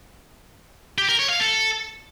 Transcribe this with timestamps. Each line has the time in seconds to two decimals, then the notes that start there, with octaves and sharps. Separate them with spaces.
0.98 G4
1.09 A#4
1.19 C#5
1.29 F5
1.40 A4